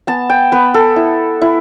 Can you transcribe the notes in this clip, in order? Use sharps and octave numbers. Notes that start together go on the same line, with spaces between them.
B3 A5
G5
B3 B4
A4
E4
E4